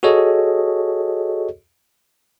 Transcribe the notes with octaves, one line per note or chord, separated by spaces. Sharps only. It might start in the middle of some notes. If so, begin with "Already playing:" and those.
F#4 G#4 A4 C#5 D#5